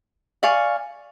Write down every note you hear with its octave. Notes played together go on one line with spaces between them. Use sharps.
D5 F5 G#5 C#6